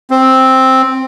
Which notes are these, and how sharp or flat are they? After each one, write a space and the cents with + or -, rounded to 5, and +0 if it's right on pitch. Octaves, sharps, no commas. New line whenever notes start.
C4 +5